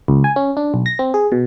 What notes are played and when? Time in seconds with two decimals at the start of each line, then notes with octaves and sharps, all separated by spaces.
0.08 C#2
0.24 G#5
0.36 C#4
0.57 D4
0.74 B1
0.86 A#6
0.99 C4
1.14 G#4
1.32 B2